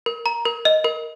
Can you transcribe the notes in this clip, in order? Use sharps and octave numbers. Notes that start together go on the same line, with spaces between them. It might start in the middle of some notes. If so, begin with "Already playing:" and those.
A#4
A#5
A#4
D#5
A#4